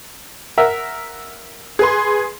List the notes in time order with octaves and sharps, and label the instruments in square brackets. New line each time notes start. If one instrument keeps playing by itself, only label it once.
[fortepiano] A#4 E5 F#5
[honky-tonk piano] G#4 B4 C6